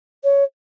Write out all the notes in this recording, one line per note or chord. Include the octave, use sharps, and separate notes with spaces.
C#5